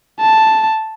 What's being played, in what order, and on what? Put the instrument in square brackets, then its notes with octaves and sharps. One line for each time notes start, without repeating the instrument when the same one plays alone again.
[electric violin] A5